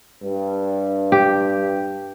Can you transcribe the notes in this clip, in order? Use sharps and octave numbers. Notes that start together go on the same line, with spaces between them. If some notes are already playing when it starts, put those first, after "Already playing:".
G2
G4